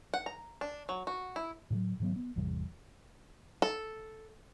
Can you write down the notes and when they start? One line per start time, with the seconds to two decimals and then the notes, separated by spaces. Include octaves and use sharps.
0.14 F#5
0.26 A#5
0.61 D4
0.89 F#3
1.07 F#4
1.36 E4
1.70 A2 D3 E3 F#3
2.00 G#2 D#3 F#3 B3
2.16 B3
2.36 G#1 E2 C3 G3
3.62 A4